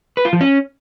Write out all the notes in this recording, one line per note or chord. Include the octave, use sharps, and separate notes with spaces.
B4
F4
F3
C#4